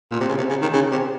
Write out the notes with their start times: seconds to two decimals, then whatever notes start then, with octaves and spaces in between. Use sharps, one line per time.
0.11 A#2
0.20 C3
0.29 C#3
0.38 C3
0.50 C#3
0.62 D#3
0.74 C#3
0.92 C3